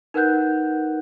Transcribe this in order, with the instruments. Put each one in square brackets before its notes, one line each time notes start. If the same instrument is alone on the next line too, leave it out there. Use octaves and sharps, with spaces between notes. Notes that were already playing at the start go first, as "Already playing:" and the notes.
[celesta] D#4 A#4 B4 F#5 F#6 G6